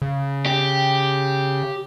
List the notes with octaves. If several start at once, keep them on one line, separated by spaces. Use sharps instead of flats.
C#3
G4